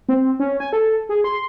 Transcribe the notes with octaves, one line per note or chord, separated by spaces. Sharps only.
C4
C#4
G#5
A4
G#4
C6